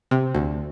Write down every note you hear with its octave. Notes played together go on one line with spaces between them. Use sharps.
C3
D2